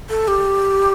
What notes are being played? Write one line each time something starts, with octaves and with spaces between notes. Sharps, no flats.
A4
G4